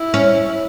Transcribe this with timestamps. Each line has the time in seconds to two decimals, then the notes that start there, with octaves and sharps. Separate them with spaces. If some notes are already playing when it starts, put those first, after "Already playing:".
Already playing: E4
0.14 C#4